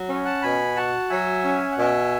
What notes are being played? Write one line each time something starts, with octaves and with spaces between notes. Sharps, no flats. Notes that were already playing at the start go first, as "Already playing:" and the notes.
Already playing: F#3
C#4
F#5 A5
B2 G#5 B5
F#4 F#5 A5
F#3 E5 G#5
C#4
F#5
B2 E5 G#5